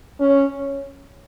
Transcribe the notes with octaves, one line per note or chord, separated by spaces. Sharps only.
C#4